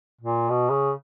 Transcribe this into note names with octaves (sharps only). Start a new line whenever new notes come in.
A#2
B2
C#3